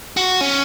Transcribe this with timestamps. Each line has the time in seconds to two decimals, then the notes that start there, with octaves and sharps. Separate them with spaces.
0.17 F#4
0.41 C#4